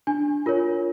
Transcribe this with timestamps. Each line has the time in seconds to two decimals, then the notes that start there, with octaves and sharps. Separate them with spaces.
0.07 D4 G#5
0.46 F4 A#4 C#5